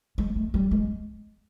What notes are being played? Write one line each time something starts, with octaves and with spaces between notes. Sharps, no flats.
G#3
A3
G3
G#3